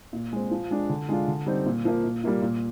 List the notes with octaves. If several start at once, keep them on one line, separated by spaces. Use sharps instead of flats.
A#2
G#3 C4
F3
G#3 D4
D3
G#3 D4 F4
D3
G3 C4 D#4
A#2
F3 A#3
A#2
G3 A#3 F4
A#2